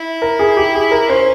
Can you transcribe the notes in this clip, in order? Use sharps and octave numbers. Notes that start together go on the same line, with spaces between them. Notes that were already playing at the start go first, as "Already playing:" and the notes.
Already playing: E4
A#4
G#4
G4
G#4
A#4
C#4 C5